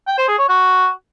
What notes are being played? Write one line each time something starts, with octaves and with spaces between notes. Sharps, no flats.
G5
C5
G#4
C#5
F#4